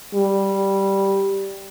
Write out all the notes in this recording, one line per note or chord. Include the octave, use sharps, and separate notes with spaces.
G3